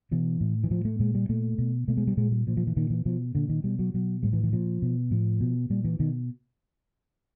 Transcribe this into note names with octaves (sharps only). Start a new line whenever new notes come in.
B2 E3
A2
E3
A2 F3
A3
A#2 G#3
G3
A#2 A3
B2
B2 A3
G#3
G3
A#2 G#3
G3
A#2 F3
F3
E3
A#2 D#3
E3
B2 F3
A#2 D3
D#3
B2 G3
F#3
B2 F#3
A2 G3
E3
E3
A#2 F3
B2
A2 F3
B2
A#2 G3
E3
B2 D#3